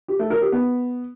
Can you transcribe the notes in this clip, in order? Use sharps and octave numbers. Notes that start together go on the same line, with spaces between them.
G4
A3
A#4
G4
B3